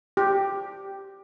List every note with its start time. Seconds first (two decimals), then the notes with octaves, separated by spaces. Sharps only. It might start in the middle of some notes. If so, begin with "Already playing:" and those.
0.17 G4